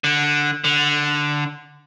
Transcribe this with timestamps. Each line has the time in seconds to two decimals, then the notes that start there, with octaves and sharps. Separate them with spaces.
0.04 D3
0.64 D3